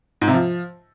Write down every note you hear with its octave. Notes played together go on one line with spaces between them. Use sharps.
G#2
C3
F3